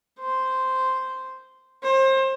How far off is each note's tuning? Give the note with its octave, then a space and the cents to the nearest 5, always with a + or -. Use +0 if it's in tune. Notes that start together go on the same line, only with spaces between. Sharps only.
C5 -5
C5 +30